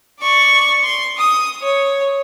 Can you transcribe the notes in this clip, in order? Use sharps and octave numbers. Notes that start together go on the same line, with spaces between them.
D5 C#6
C6
D#6
C#5